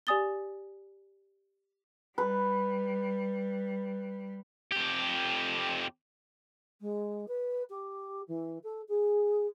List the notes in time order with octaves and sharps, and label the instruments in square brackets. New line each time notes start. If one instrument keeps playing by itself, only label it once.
[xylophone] G4 D5 G#5 D#6 A6 G7
[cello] G3 [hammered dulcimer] B4
[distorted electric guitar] F2 G4
[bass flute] G#3
B4
G4
E3
A4
G#4